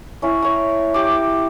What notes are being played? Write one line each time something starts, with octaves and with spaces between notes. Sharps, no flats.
C#4 E4
C#5 A#5
G4 D6